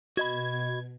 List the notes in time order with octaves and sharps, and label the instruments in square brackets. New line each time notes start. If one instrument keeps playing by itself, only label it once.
[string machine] B2 [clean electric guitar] F#4 D#5 B5 [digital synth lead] G#6